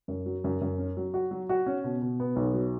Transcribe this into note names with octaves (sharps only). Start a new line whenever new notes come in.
F#2
F#3
F#2
F#2
C#4
F#3
F#4
F#3
F#4
C#4
B2
B2
B3
B1
F#3